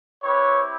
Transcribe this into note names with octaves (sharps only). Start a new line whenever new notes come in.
C4 E4 G4 B4 C#5